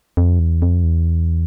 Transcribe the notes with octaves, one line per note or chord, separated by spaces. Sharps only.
F2
E2
F2
E2